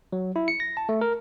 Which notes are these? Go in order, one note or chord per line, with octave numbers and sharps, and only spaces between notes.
F#3
E4
C#7
A#6
A5
A3
A#4